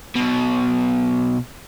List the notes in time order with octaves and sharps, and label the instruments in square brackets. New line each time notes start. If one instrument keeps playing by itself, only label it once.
[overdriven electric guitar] B1 B2